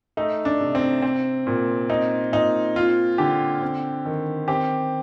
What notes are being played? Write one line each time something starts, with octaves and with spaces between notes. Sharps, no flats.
A3 D#4
D4
C3
C4
C4
A#2
C4 D#4
A#2 D#4
C4 F4
D3 G4
C4
D#3
C4 G4